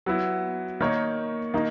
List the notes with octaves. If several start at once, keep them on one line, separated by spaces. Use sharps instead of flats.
F#3 B3 E4
D#3 A#3 D#4 A#4 C#5
D#3 A#3 D#4